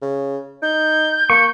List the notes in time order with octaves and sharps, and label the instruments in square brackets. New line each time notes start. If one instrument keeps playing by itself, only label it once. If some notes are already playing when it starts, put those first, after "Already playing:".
[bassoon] C#3
[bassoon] D#4 [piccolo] G6
[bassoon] A#3 [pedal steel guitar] C#6